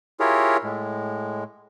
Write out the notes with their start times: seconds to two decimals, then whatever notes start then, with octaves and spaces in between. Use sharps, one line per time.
0.20 E4 F4 G4 G#4 A#4 C#5
0.64 A2 G#3